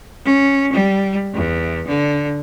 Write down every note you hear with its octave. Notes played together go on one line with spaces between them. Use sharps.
C#4
G3
E2
D3